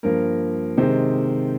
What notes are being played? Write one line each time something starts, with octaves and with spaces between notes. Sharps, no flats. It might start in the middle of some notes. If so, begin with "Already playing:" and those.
G2 F3 A#3 A#4
C3 D#3 G#3 C5